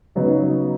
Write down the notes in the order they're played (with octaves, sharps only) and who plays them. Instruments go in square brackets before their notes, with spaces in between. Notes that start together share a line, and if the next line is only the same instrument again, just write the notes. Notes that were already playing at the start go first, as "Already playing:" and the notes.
[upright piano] C#3 F#3 B3 D#4